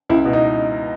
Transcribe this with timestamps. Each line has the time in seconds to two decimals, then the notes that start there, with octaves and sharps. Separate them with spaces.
0.10 C#2 E4
0.25 B2
0.33 D#4